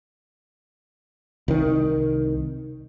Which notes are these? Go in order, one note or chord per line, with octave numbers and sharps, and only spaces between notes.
C2 D#3